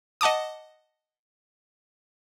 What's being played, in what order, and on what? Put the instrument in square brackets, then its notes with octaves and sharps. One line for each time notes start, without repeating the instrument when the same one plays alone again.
[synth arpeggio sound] D#5 F#5 A5 D6 D#6